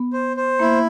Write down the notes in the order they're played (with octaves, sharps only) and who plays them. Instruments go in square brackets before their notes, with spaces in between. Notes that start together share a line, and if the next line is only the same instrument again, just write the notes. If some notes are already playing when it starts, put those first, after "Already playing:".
Already playing: [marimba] B3
[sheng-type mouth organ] C5
C5
[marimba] A#3 [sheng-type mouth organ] E4